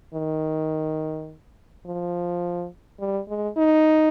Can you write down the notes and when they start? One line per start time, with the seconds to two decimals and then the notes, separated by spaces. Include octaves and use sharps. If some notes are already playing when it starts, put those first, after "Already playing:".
0.14 D#3
1.86 F3
3.00 G3
3.29 G#3
3.57 D#4